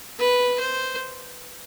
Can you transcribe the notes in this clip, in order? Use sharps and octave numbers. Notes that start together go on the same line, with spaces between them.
B4
C5